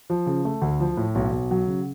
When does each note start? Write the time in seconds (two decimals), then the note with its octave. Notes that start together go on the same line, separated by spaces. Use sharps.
0.10 F3
0.27 C#3
0.45 A3
0.62 D2
0.80 F3
0.97 A2
1.15 B1
1.32 B1
1.51 F#3
1.67 C#3